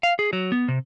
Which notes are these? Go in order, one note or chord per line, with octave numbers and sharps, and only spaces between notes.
F5
G#4
F#3
B3
C3